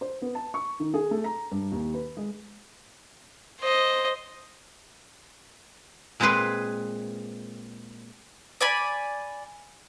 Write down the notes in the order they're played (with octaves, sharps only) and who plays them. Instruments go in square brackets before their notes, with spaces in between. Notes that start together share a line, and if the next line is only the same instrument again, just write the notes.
[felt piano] C5
B3
A5
C#6
D#3
G#4
A3
A#5
G2
D#2
B4
G#3
[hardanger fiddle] C5 D#5
[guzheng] A#2 G#3 C4 G#4 B4 C6
[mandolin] D5 G#5 B5